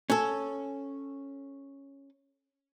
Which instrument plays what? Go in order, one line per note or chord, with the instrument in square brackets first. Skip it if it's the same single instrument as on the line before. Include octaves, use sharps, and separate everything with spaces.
[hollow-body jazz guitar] C#4 A4